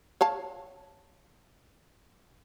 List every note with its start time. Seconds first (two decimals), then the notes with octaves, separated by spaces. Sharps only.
0.21 C#5 F5 A5